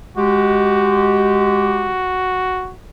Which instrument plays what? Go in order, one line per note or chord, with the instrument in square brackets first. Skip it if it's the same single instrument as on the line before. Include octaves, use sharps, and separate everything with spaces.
[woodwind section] G#3 G4 [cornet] F#4